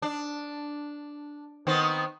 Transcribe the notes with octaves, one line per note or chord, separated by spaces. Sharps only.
D4
D#3 B3 C4